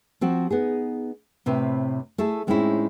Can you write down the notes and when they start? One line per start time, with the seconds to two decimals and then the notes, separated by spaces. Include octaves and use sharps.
0.21 F3 C4 F#4
0.50 B3 D#4 G#4
1.46 A2 C3 C4 B4
2.18 A3 E4 G#4 A4
2.47 A2 G#3 C4 C#4 D#4 E4